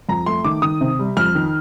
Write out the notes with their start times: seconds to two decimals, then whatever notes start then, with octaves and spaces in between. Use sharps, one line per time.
0.09 F2 A#5
0.26 A3 C6
0.44 D#3 D6
0.62 D#3 D#6
0.81 C3
0.99 G3
1.17 F2 F6
1.35 D#3